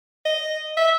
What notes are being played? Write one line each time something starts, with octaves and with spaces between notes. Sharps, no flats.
D#5
E5